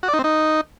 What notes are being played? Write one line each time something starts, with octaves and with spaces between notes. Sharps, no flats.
F#4
D5
D#4
C4
D#4